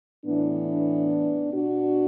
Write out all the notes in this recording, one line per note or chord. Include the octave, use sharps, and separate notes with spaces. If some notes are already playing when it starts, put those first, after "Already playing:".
A2 E3 B3 D4
B2 D4 F#4